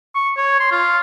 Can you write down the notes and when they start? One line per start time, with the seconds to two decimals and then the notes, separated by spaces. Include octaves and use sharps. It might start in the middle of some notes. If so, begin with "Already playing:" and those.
0.15 C#6
0.37 C#5
0.60 C6
0.71 F4